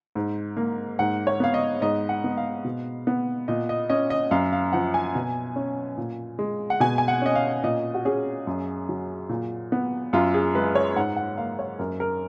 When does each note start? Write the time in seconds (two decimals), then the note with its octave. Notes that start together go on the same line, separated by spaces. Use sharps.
0.15 G#2
0.57 A#3
0.99 G#2 F#5
1.27 C#5
1.40 B3 F5
1.54 D#5
1.81 G#2 D#5
2.09 F#5
2.24 B3
2.37 F5
2.64 B2
3.07 B3
3.48 A#2 D#5
3.69 D#5
3.90 C#4 D#5
4.10 D#5
4.31 F#2 F5
4.53 F5
4.72 F3 F#5
4.94 G#5
5.15 B2
5.56 C#4
5.97 A#2
6.39 G#3
6.70 F#5
6.80 B2 G#5
6.98 G#5
7.08 F#5
7.22 C#4 D#5
7.35 F5
7.63 A#2 D#5
7.94 F#4
8.05 C#4 G#4
8.47 F#2
8.89 F#3
9.29 A#2
9.72 B3
10.13 F#2 F4
10.34 G#4
10.54 G#3 B4
10.75 C#5
10.96 G#2 F#5
11.16 F#5
11.38 A#3 F5
11.59 C#5
11.79 F#2 A#4
12.00 A#4